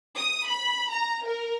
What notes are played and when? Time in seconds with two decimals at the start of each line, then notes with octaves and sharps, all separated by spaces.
0.17 D#6
0.48 B5
0.91 A#5
1.26 A#4